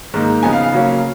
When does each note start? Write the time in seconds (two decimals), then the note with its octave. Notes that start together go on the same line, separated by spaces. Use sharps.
0.14 G#2 D#3 A#3 D#4
0.43 C#3 F3 B3 D#4 G#5
0.53 F5
0.63 F5
0.72 C#3 F#3 A#3 C#4